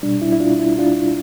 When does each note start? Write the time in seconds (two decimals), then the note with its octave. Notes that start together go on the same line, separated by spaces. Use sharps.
0.03 C2 B2 G3 D4
0.22 E4
0.32 E4
0.40 D4 F4
0.59 E4
0.78 D4 F4